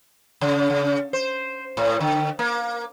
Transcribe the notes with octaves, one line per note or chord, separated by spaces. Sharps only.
C#3
C#3
C5
A2
D3
A#3